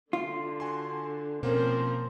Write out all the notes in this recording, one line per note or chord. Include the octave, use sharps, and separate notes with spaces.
D3 F4
F#4 G#5 C6
B2 F3 A#3 C4 C#4 A#4 C5